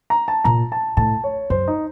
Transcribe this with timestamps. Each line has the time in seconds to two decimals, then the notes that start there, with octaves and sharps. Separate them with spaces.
0.10 A#5
0.28 A5
0.44 A#2 A#5
0.72 A5
0.97 A2 A5
1.24 C#5
1.50 F#2 C5
1.68 D#4